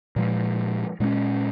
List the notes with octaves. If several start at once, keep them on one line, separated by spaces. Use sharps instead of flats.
A#2 F3 G#3
A#2 G#3 C#4